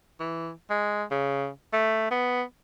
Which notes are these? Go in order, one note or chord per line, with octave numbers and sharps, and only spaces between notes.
E3
G#3
C#3
A3
B3